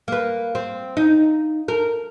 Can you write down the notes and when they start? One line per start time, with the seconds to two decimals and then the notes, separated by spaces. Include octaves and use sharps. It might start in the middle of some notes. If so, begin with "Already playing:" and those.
0.08 A#3 B4
0.55 C4
0.97 D#4
1.68 A#4